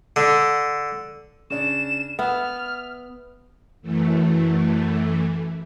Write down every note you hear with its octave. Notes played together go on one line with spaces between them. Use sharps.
D3
C#3 D4 E7
B3 E5 F6
F#2 E3 A3